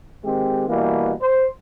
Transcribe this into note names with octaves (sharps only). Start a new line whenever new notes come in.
D#3 G#3 C4 G4
B2 E3 G3 A#3
C5